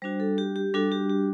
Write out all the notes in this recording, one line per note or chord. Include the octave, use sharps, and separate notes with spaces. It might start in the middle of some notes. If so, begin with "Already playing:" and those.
G3 D4 F#4 C5
A4
G4
G4
G3 D4 F#4 A4
G4
G4